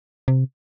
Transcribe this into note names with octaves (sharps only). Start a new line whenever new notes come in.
C3